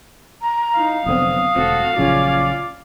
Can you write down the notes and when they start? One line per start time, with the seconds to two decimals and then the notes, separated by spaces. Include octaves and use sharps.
0.42 A#5
0.75 D#4 E4 F5
1.06 F1 D3 F#3 B3 C4 D#6
1.56 E1 D2 C4 F#4 A4
1.98 A#1 C#3 F#3 C#4 F4 D5